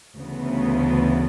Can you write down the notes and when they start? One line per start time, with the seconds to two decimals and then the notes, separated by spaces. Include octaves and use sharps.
0.16 D2 C#3 E3 B3